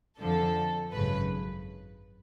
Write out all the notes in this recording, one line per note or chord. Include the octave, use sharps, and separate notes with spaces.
F2 D3 F3 A4
G#1 F#2 C#3 B4